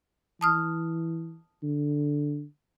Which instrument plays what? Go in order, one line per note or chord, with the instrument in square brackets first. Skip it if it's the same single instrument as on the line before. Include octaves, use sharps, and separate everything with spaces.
[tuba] E3 [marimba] A5 D#6 F6
[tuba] D3